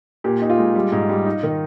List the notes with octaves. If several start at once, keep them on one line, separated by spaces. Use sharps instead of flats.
A#2 G4
D#4
F4
G#3
G3
G#2
G3
D#4
D#3